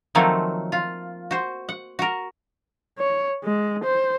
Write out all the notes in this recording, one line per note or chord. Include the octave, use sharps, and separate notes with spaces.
D#3 F3 F#3 A3 A#3 C4
F4
F#4 C5
F#5
F#4 A#4
C#5
G#3
C5